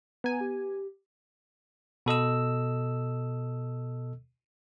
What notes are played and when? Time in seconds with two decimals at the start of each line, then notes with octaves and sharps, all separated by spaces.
0.24 B3 G#5 A#5
0.41 G4
2.06 B2 A4 D#5 E6